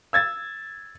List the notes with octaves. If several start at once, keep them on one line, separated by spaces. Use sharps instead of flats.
E6 G#6 A6